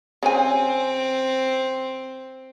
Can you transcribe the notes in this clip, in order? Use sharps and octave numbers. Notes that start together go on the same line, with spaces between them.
C#3 C4 G#5